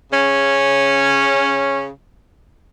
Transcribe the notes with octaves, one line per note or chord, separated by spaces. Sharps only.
C#3 C#4